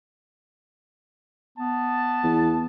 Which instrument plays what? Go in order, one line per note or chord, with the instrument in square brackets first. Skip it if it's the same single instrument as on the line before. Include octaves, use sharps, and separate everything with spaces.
[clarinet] B3 [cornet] A5
[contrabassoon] E2